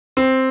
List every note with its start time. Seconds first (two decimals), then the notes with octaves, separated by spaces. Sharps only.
0.17 C4